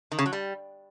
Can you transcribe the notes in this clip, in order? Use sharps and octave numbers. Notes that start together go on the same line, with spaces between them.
D#3
C#3
F#3
G3